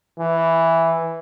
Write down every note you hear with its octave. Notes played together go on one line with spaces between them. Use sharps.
E3